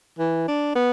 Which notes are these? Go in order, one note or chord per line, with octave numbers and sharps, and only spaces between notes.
E3
D4
B3